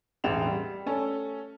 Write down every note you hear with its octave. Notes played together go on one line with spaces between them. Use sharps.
E1 A1 G#3 F#5 E7 F7
G3
A3 C#4 A4